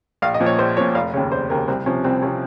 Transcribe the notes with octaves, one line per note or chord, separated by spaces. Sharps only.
A#1 F5
D#5
A#2 F3
C#5
A#1 C5
A#2 F3 C#5
F1 F5
D#2 C#3 C#5
F1 C5
D#2 C#3 A#4
C2 C4
C3 F3 C#4
C2 C4
C3 F3 C#4